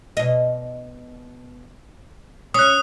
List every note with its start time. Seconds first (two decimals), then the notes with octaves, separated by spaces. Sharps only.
0.17 B2 D#5
2.54 C#4 D#6 F#6